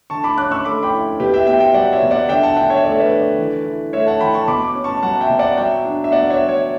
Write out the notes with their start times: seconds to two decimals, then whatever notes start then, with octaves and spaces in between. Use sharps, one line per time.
0.10 D3 A5 C#6
0.24 B5 D6
0.37 C#4 D6 F#6
0.52 C#6 E6
0.65 A3 B5 D6
0.83 G5 B5
0.93 E4
1.20 B2 G4 B4
1.34 E5 G5
1.47 B3 E5 G5
1.60 E5 G5
1.74 F#3 D5 F#5
1.92 C#5 E5
2.02 B2
2.11 D5 F#5
2.29 D3 E5 G5
2.43 F#5 A5
2.57 D4 E5 G5
2.70 C#5 E5
2.84 A3 D5
2.92 E5
3.00 B4 D5
3.11 D3
3.39 E3
3.66 E4
3.93 A3 C#5 E5
4.06 F#5 A5
4.20 E3 G5 B5
4.34 A5 C#6
4.48 B2 B5 D6
4.75 C#4
4.84 A5 C#6
5.02 F#3 F#5 A5
5.21 E5 G5
5.30 B2
5.39 D5 F#5
5.57 F#3 E5 G5
5.85 D4
6.04 E5
6.12 B3 D5 F#5
6.23 F#5
6.30 C#5 E5
6.39 F#3
6.49 C#5 E5